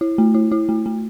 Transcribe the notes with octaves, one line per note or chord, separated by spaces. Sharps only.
E4
A3
E4
E4
A3
A3